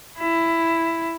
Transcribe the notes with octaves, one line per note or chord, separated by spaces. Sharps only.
E4